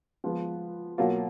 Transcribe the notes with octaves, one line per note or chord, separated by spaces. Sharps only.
F3 G#3 B3
B2 F#3 A#3 F4